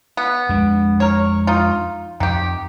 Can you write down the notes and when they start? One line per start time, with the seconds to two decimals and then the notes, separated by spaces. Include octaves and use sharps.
0.17 B3
0.49 F2 G#3 D4
1.00 A#4 C#5
1.47 D#4 F4
2.20 F2 D#3 G4